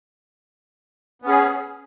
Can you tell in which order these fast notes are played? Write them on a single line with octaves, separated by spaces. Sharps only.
B3 C#4 G#4